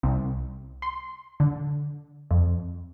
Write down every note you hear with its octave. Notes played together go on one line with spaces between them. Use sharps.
C2
C6
D3
F2